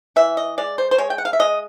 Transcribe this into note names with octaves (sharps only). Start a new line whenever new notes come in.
E3 E5
D#5
G#3 D5
C5
C5
G#3 C#5
G5
F#5
F5
E5
G#3 D#5